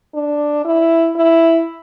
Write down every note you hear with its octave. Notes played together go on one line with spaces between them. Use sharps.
D4
E4
E4